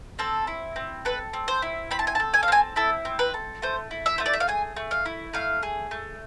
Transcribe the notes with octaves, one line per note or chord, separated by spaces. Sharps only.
C4 A4
E4
C4
A4 B4
C4
C5
E4
C4 B5
A5
G#5
A5
A4
G#5
F5
C4 G#5
E4 A4
C4
B4
A4
A3 C5
E4
E5
A3 C5
D5
E5
F5
G#4 G#5
A3
F5
E4
A3 F5
G#4
A3